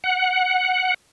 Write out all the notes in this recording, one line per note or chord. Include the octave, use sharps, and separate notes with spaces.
F#5